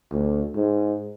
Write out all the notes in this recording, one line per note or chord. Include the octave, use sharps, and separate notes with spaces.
D2
G#2